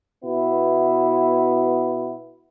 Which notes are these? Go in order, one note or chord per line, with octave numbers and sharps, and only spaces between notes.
B2 B3 E4